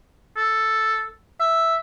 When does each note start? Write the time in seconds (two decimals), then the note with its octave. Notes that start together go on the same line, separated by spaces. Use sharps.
0.36 A4
1.40 E5